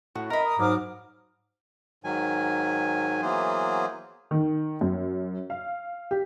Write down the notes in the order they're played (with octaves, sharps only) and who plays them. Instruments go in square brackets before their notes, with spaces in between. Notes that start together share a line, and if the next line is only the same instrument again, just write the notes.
[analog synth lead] A2 [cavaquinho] F#4
[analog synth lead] A#4 [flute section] D#5 E5 [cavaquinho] A#5 B5
[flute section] D#6
[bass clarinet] G#2 [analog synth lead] F#3 [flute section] D6 D#6 F6
[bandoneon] G#2 D#3 F#3 G#5
E3 F#3 A#3 B3 G#4 C5
[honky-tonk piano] D#3
F#2
F5
G4